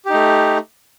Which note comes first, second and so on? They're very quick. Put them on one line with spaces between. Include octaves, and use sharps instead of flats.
G4 D#4 A3